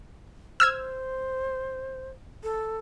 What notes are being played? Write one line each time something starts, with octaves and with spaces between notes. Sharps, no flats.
C5 E6 F6 G#6
A4